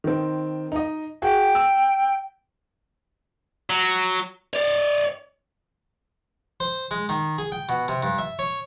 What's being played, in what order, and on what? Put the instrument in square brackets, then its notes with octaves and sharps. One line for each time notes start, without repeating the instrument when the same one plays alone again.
[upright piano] D#3 C4
D#4 D#5
[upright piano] F#4 G#4 [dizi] G5
[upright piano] E6
[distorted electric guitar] F#3
[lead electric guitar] C#5 D5
[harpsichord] C5
G#3
D#3
G#4
G5
B2
C3
G2
E5
C#5